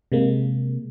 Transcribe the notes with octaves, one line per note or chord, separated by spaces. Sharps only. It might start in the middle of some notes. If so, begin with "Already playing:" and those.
C3 G#3 A#3